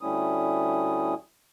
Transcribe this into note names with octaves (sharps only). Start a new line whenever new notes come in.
D2 G3 A3 C#4 E4 D#6